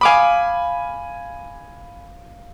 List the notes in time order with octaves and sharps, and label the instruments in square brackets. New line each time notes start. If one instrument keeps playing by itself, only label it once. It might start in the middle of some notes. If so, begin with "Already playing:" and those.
[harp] F5 D6 D#6 [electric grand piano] G#5 B5